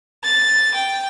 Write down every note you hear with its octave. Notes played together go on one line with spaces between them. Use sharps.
A6
G5